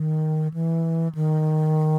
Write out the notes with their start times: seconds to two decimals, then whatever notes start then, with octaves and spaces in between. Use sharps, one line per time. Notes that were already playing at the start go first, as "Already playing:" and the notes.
Already playing: D#3
0.54 E3
1.15 D#3